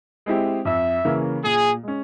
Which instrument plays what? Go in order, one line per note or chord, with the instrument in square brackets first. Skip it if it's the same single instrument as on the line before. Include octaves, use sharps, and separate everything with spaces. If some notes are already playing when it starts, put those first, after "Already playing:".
[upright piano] G#3 C4 E4 G4
[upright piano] F2 [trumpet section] E5
[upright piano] C#3 E3 A#3 C#4
[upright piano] A#2 [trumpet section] G#4
[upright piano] G#3 C#4